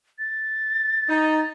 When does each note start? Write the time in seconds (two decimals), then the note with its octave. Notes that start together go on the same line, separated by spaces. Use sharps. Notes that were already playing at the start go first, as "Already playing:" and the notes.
0.19 A6
1.09 D#4